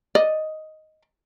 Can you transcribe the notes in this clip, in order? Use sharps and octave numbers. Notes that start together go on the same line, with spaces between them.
D5 D#5